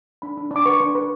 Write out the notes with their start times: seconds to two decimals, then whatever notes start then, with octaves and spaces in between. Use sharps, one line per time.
0.22 D4 B5
0.37 D4
0.51 D4 D6
0.66 B4 C#6
0.80 D4 C6
0.95 B4